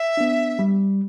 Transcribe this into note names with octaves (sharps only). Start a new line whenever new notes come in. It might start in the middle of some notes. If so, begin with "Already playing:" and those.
Already playing: E5
B3 D4
G3